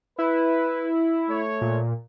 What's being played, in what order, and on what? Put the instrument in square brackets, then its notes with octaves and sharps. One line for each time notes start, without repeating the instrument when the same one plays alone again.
[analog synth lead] E4 [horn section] B4
[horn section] A3 C#5
[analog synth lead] A#2